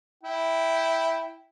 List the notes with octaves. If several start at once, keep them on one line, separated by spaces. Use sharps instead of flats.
E4 G5